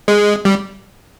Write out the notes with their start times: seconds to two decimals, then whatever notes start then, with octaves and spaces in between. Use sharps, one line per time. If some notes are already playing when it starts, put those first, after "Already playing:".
0.08 G#3
0.45 G3